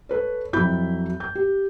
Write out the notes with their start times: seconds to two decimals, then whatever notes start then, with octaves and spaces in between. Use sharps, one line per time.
0.09 A4 B4 C#5
0.53 F2 F#3 E4 B5 G6
1.20 G6
1.35 G4